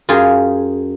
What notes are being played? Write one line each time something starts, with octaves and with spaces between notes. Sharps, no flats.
F#2 F4 G4 G#4